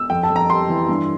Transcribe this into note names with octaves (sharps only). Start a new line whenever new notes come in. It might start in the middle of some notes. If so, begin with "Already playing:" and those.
Already playing: E6
F2 G5
A5
F2
A#5
G3 C6
E3
G2